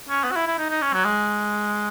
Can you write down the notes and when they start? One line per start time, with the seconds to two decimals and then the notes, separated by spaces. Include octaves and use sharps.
0.09 C#4
0.24 B3
0.32 F#4
0.36 E4
0.47 E4
0.58 D#4
0.70 D#4
0.82 C#4
0.94 F#3
1.05 G#3